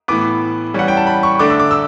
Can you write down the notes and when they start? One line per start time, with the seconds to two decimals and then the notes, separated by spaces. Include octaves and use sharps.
0.08 A2 E3 B3 D6
0.74 E3 G3 C#4 F#5
0.88 G5
0.97 A5
1.07 B5
1.23 C#6
1.39 D3 A3 D4 D6
1.50 E6
1.60 D6
1.71 E6